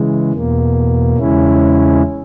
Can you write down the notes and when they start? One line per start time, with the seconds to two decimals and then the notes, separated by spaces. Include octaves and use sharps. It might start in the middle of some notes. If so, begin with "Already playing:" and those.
Already playing: C#3 E3 G#3
0.33 E2 B2 A#3
1.17 E2 C#3 G#3 C#4 E4